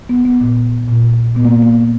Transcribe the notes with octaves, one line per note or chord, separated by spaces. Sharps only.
B3
B3
A#2
A#2
A#2 B3
A#3
A#3